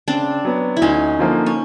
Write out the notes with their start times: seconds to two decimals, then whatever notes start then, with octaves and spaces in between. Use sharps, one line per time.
0.08 C#3 C4 D4
0.45 F#3 B3
0.77 E4
0.82 D2 C#4 D#4
1.19 D3 F3 A#3
1.46 C#4